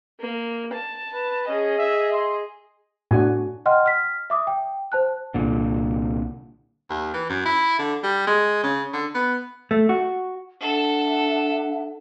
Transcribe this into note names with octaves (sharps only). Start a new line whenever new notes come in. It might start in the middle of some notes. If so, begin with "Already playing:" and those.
A#3
A5
B4
C#4 G#4 D#5
E5
C6
A2 D4 F#4 G#5
D#5 F#5 G5 C6 F6
F6 B6
E5 D6 D#6
G5
C5 A5 F#6
C2 A#2 D3
D#2
E3
F#2
E4
D3
G3
G#3
C#3
D3
B3
A3
F#4
D4 A4 E5 F#5